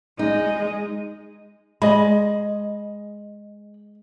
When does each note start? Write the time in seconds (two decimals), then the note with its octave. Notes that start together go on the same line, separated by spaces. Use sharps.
0.19 G#3 D#4 D#5
1.82 G#3 D#5 B5